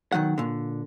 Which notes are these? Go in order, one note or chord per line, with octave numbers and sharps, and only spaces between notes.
B1 D#3 F#3 F#5
A#2 D3